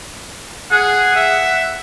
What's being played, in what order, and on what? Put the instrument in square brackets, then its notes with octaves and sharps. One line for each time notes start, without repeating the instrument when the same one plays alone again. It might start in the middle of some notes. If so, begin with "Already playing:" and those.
[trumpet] G#4 [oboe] F#5
[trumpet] E5